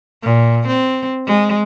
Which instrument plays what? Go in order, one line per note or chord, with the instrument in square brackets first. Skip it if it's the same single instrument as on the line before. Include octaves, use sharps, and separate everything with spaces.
[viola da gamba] A#2
C4
G#3